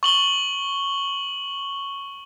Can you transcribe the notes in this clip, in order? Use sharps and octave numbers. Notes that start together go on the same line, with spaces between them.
C#6 F#7 G7